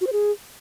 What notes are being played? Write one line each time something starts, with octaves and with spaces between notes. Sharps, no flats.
F#4
C5
G#4